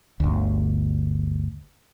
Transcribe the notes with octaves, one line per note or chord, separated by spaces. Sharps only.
G1 D2